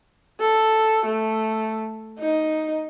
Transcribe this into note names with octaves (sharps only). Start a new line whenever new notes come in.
A4
A3
D#4